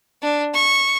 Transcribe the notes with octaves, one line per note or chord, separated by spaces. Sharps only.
D4
C#6